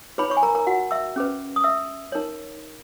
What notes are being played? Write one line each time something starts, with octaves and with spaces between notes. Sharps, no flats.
D#4 G#4 B4 C#5 B5
C#5 C#6
G#5
A#4 A#5
A#4 A#5
F#4 F#5
E5 E6
C#4 G#4 B4
D#6
E5 E6
D#4 A#4 C#5